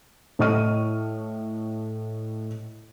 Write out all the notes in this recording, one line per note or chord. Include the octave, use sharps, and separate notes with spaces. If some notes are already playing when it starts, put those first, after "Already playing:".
A2 A3 D#5 C#6 F6 D#7